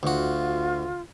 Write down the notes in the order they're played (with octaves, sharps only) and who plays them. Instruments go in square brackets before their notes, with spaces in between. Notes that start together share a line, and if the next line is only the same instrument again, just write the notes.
[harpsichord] D2 F#4 [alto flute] F4